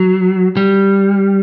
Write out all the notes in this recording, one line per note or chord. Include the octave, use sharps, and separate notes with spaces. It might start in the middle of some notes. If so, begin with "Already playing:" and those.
Already playing: F#3
G3